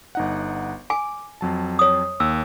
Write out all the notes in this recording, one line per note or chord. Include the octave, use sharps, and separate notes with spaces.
G1 D#4 F#5
G#5 D6
F2 F#3 A5
C#5 D#6
D#2 E6